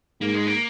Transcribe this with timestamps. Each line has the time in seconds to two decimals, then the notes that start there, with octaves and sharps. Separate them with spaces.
0.20 G#2 A#3
0.34 G#3
0.46 A#3